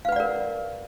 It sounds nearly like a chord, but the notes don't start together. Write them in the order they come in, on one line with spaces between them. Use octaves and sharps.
F5 B4 F#5 D5 A#4